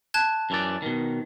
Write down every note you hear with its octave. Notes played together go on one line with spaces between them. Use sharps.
A5 F#6 G#6
F#2 E3 D5
B2 D#3